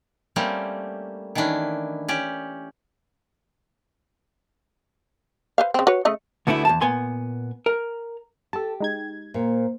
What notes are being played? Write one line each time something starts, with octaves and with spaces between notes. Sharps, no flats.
G3 A3 A#3 C4 C#4 G4
D#3 E3 C#4 D4 E4
C#4 G4 D5
B4 C5 F5
C#3 C4
F#4 B4 C#5
C#3 A3 D#5
D2 B2 D3 A3 B3 E4
E2 D#3 A5
A#2 B3 G#5 C6
A#4
G4 A4 A5
G#3 D#4 G#6
A#2 A#3 C5